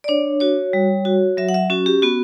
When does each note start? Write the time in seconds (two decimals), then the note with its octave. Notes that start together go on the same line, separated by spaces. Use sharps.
0.04 D5
0.08 D4 C#5
0.40 F#4 C#5
0.73 G3
1.05 F#4
1.37 F#3 E5
1.49 F#5
1.54 E5
1.70 C#4 F#4
1.86 G4
2.02 B3 F#4